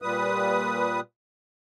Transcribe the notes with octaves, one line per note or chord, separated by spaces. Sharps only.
A#2 G3 B4 D#6